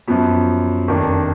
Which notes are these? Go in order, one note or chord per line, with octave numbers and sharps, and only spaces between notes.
F#2 F3 B3
F1 F2 D#3 A#3 D4